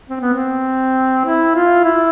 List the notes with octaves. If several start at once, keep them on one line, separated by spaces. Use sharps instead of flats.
C4
B3
C4
E4
F4
E4